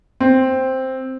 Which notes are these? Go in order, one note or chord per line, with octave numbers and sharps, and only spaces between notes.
C4